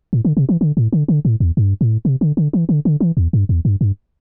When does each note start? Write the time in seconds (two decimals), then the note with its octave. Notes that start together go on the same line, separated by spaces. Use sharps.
0.13 A2
0.25 D3
0.37 C3
0.49 E3
0.61 D3
0.77 A2
0.93 D3
1.08 D3
1.25 A2
1.40 E2
1.57 G2
1.81 A2
2.05 C3
2.21 D3
2.37 D3
2.53 E3
2.69 D3
2.85 D3
3.00 E3
3.17 E2
3.33 G2
3.49 E2
3.65 G2
3.81 G2